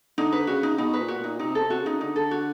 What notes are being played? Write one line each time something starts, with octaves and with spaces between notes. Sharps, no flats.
D3 D#4
B4
C#3 F#4
D#4
B2 D#4
B4
A#2
F#4
A#2 D#4
C3 D#4
A4
C3
F#4
C#3
D#4
D3 D#4
A4
F#4